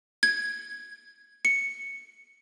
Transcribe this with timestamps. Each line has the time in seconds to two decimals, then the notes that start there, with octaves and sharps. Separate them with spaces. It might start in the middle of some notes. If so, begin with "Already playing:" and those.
0.23 G#6
1.45 C#7